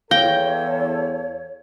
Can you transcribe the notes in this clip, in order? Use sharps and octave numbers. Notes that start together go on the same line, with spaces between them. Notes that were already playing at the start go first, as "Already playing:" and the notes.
E2 A4 C#5 F5 G5